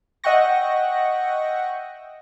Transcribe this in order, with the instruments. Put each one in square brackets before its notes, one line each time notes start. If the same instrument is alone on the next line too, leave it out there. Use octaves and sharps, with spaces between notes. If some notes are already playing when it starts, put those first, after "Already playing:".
[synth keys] D#5 E5 F#5 G5 C#6 A#6